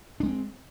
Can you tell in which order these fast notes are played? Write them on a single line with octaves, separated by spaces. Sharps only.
D4 G#3 C4